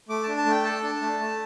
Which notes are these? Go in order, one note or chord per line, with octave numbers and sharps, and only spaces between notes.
A3 D6
D4 A5
A5
A3
G5
A4 A5
D4
A3
A3